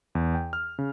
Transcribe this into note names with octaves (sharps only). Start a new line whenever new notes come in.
E2
G5
F6
C#3